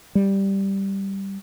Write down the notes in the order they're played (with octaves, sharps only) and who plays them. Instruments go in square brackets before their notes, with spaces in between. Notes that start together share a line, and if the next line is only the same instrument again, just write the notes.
[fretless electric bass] G3